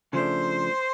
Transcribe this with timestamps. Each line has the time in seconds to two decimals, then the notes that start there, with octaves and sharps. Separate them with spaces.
0.13 C#3 F3 A3 D4 C5